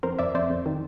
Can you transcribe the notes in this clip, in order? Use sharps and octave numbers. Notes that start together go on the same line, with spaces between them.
F2 A#4 C5
F2 D5 E5
F2 C5 D5
F2
D#3